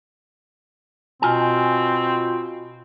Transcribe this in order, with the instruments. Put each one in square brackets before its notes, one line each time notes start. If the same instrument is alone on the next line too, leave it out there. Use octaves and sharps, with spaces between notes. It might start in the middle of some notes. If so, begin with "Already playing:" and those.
[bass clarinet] B2 [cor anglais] C4 [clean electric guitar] F4 G#5